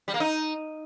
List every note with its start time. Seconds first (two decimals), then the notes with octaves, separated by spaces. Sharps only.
0.08 G3
0.14 A#3
0.20 D#4